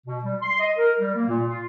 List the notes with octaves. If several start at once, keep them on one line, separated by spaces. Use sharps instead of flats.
B2
G3
C6
D#5
A#4
G3
A#3
A#2
F4